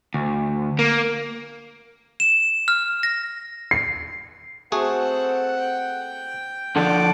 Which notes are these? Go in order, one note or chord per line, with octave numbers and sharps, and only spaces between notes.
D2
A#3
E7
F6
A#6
C7
A3 C4 F#4 G#4 A4 F#5
G5
D3 F3 A4 D5 F#5 D6